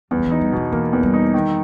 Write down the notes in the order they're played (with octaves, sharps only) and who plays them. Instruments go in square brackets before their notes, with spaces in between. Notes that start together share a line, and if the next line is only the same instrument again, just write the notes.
[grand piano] E2 [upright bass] G3
[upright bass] D#3
E3
[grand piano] D#4
[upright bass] G3
[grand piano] B2 [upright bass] E3
[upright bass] E3 [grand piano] A#3
[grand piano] E2
[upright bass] G3
[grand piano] D#4
D#3